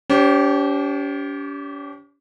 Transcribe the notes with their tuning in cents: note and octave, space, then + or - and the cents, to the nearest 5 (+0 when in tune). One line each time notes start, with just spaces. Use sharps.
C#4 +45 G4 -15 C5 +10